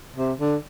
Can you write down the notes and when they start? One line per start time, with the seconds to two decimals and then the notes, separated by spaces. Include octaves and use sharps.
0.16 C3
0.40 D3